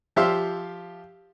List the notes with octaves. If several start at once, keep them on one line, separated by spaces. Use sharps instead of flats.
F3 G4 E5 F5 C6